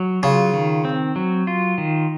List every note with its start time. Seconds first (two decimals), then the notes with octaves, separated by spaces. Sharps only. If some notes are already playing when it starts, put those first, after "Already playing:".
Already playing: F#3
0.23 C#3 F4
0.54 D#3
0.85 C4
1.16 F#3
1.47 F4
1.78 D#3